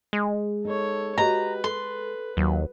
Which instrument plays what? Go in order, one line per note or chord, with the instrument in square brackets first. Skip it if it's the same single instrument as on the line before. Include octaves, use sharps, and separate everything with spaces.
[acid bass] G#3
[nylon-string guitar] D#4 [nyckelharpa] A4 C#5
[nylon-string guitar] F#4 G4 D#5 [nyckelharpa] B4 [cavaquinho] A#5
[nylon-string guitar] A4 [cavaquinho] C6
[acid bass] D#2 [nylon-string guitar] F#3